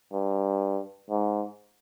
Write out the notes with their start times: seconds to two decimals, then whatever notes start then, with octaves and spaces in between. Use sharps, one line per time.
0.13 G2
1.10 G#2